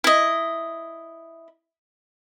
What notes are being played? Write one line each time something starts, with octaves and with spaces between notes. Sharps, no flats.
E4 D#5